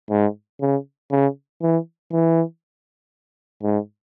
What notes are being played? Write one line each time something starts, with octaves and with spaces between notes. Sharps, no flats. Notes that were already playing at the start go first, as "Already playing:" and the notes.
G#2
C#3
C#3
E3
E3
G#2